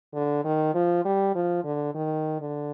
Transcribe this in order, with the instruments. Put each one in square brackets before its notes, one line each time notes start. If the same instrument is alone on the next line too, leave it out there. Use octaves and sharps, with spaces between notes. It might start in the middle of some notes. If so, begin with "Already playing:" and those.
[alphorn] D3
D#3
F3
G3
F3
D3
D#3
D3